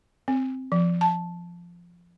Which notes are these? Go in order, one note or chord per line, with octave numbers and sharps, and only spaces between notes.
C4
F3
A5